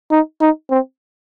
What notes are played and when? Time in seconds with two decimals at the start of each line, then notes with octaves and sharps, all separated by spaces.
0.11 D#4
0.41 D#4
0.70 C4